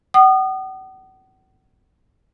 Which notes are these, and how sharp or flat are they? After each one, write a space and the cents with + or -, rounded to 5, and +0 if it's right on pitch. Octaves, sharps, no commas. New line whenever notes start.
F#5 +45 D#6 -30